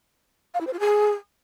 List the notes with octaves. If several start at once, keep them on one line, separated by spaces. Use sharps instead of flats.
F5
E4
C5
F4
G#4